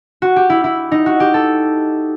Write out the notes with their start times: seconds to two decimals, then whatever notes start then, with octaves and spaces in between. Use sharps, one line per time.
0.22 F#4
0.36 G4
0.50 E4
0.64 E4
0.92 D#4
1.06 F#4
1.20 G4
1.34 A4